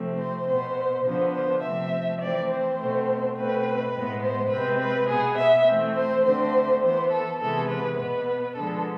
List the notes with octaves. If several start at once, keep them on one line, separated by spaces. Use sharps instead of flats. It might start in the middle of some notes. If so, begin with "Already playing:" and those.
Already playing: C3 F3 A3 C4
C5
B2 B3 C5
D3 F3 B3 C5
C5
C3 F3 A3 C4 E5
E3 A3 C4 D5
C5
B2 A3 C4
B2 A3 C4 B4
A2 G#3 B3
C5
C3 G#3 C4 B4
B4
B2 B3 G#4
E5
E3 A3 C4
C5
D3 A3 C4 C5
E3 B3 C5
A4
C3 E3 G#3 B3 A4
B4
B2 B3 B4
D3 F3 G#3 B3 A4